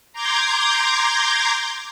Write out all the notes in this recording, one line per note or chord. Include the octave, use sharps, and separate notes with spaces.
A#5 C6 D6 G6 G#6 A#6